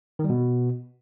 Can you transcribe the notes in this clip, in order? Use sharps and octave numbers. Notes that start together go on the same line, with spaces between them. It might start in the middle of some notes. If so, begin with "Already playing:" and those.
D#3
G3
B2